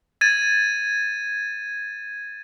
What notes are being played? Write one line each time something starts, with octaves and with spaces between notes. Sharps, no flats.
G#6 A6 D#7